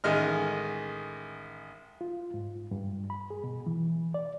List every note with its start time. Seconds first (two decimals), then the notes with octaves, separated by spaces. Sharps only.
0.04 A1 D#3 G#3 D#5 F6
2.01 F4
2.34 G#2
2.71 G2
3.10 B5
3.30 G#4
3.44 B2
3.66 E3
4.14 D5